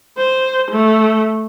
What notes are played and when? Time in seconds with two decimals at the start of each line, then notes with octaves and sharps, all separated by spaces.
0.17 C5
0.72 A3